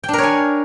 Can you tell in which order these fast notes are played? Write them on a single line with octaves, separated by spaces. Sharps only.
G5 D4 A#4 C#5 G#5